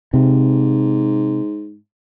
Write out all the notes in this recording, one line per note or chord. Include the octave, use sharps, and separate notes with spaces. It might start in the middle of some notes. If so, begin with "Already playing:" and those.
G#2 C3